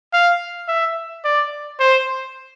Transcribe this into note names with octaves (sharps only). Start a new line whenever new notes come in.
F5
E5
D5
C5